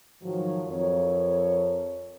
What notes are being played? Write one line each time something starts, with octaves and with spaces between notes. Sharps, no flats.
G#2 D#3 F3 F#3
F2 A#4 C#5